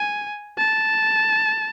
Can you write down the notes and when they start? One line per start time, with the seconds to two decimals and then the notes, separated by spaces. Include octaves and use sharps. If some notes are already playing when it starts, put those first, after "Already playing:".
Already playing: G#5
0.58 A5